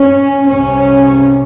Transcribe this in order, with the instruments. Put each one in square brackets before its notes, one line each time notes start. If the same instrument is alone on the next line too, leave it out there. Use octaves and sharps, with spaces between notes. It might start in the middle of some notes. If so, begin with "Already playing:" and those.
Already playing: [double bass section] C#4
C2 C3 C#4